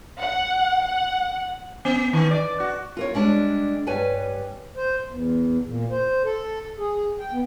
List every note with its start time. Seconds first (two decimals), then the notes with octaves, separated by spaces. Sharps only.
0.20 F#5
0.82 F#5
1.85 B3
2.13 D#3
2.31 D5
2.60 F#4
2.97 F4 A#4 C#5
3.14 G3 G#3 D4
3.87 G2 G3 B4 C#5 G#5
4.76 C5
5.08 E2
5.66 A#2
5.91 C5
6.24 A4
6.78 G#4
7.19 G5
7.32 B3